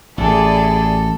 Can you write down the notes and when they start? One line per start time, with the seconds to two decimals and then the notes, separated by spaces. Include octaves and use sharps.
0.18 A1 E4 G#4 A4 D5